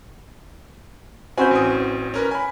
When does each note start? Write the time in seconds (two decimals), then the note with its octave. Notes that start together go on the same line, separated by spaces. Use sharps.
1.38 C4 C#4 F#4 G#5 B5 G6
1.51 A1 E3 D#6
2.14 C#4 A#4 B4
2.31 G#5 B5